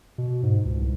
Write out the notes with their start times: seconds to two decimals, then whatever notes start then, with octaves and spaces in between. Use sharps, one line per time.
0.18 B2
0.43 G#2
0.65 C#2
0.81 C2